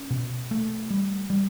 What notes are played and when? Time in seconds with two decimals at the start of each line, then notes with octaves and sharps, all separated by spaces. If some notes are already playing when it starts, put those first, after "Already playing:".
Already playing: C#4
0.10 B2
0.51 A3
0.90 G3
1.30 G3